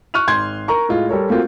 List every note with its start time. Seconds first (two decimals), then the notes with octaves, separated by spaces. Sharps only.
0.14 C#6 F6 F#6 D#7 F7
0.27 G#1 C6 G6 G#6
0.68 A#4 A#5 C#6
0.89 A2 G#3 F4
1.09 G3 A4 A#4 C#5
1.29 A3 A#3 C4 F4 F#4